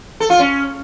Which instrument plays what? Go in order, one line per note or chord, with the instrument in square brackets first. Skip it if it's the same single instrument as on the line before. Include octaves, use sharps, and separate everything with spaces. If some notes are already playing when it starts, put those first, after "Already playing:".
[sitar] A4
F4
C#4